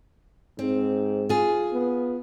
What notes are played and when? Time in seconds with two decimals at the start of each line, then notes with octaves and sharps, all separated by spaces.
0.59 G#2 C4
1.29 F4 G#4
1.73 B3